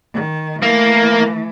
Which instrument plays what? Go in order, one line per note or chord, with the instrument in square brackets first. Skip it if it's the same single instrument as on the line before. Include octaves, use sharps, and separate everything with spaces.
[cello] D#3
[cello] E3 A3 [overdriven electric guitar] A#3